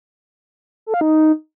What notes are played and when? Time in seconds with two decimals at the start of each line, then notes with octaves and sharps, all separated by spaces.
0.86 A4
0.94 F5
1.01 D#4